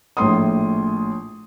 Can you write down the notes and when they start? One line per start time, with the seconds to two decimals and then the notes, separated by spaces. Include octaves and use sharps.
0.17 A#1 A2 C6 D#6